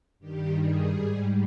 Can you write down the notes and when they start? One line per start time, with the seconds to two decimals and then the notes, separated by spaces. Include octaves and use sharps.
0.19 G2 D#3 G3 G4
0.54 G#4
0.88 G#2 G3